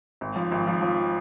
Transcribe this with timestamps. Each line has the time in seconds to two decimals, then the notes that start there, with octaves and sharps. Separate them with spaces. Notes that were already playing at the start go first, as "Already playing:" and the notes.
0.21 G#1
0.36 F3
0.51 G#1
0.67 F3
0.82 F3